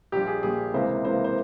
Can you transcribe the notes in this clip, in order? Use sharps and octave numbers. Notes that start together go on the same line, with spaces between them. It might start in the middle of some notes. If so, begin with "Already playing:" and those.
A#1 A#2 G3 G4
G#4
A#1 A#2 G3 G#4
C#2 C3 E3 A#3 C5
C#2 C3 E3 A#3 C5
C5